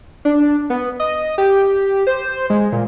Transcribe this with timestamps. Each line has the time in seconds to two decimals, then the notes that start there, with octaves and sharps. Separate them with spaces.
0.25 D4
0.70 B3
1.00 D#5
1.38 G4
2.07 C5
2.50 G#3
2.72 A#2